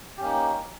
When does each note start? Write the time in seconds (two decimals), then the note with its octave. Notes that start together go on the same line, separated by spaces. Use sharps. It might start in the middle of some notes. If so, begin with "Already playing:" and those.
0.17 G4
0.20 C#4
0.23 A#3
0.25 D#4